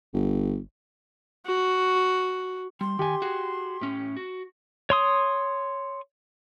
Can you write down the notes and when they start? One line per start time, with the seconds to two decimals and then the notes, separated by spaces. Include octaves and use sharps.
0.13 G1
1.46 F#4
2.81 G3 C6
2.99 D#3 G4 G#5
3.22 F#4 G#4
3.81 A2 C#4
4.17 F#4
4.90 C#5 C6 D#6